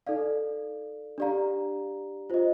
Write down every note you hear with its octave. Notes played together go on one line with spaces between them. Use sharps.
D#4 A4 D5 F5
D4 G4 D5 F5 A#5
F4 C5 D#5